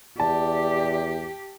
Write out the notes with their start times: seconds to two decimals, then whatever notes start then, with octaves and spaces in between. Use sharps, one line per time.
0.20 E2 G4 D5 A5